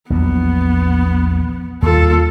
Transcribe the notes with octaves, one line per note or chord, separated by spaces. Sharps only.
A#1 E2 F#3 B3
D#2 G3 A#3 F4 A4